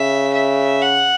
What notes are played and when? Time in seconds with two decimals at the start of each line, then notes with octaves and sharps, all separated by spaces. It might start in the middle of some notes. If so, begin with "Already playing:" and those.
Already playing: C#3 E5
0.35 E5
0.82 F#5